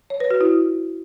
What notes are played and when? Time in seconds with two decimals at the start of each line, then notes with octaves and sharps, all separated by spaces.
0.10 C#5
0.20 B4
0.31 F#4
0.41 E4